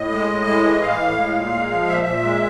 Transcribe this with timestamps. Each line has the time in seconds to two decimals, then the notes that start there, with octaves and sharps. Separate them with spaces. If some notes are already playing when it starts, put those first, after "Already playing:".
Already playing: A2 D#5
0.11 G#3
0.29 A2
0.46 G#3
0.64 E3
0.81 A2 F5
1.00 A2
1.18 G#3
1.35 A#2
1.53 G#3
1.71 F3
1.88 A#2 E5
2.06 A#2
2.24 G#3